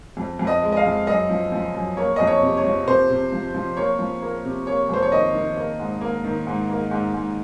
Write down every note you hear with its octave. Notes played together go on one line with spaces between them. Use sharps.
F2
F2
D#5
G#3
D#5
F5
F2
F#2 D#5
F3
F3
F#2
A#3 C#5
F2 D#5
C#5
C3
C#5
F3
C3 C5
C3
F3
F3
A#3 C#5
F3
A#3
C3
A#3 C#5
F2 C5
C#5
D#3 D#5
D#3
A#3
G#2
A#3
D#3
G#2
A#3
G#2
G#2